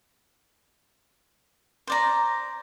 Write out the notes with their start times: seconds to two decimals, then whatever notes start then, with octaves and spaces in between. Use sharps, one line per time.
1.87 C5 D5 A#5